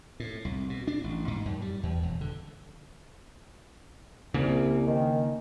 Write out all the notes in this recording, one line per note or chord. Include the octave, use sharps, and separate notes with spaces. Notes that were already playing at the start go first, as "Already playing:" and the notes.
A2
C2
B2
D4
A1
G#2
F#2
G3
E2
E1
D3
C2 C#3 A#3
D#3